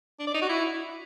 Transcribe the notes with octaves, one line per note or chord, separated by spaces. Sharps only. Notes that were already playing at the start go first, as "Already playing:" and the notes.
D4
D5
D#4
F#4
E4